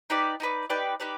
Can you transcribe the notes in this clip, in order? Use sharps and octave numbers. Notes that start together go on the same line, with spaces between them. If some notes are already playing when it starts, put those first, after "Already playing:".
D#4 G4 B4 D5
D#4 G4 B4 D5
D#4 G4 B4 D5
D#4 G4 B4 D5